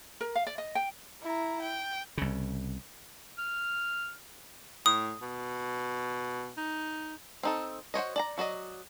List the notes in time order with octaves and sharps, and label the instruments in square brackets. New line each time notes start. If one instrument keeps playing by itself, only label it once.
[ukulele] A#4
F5
D5
D#5
G5
[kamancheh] E4 A#5
G5
[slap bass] C2 C#3
[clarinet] F6
[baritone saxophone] A2 [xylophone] D#6
[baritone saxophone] B2
D#4
[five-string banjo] C4 D#4 A4
F#4 C5 C#5 D#5
D5 A5 A#5
F#3 F#4 D5 D#5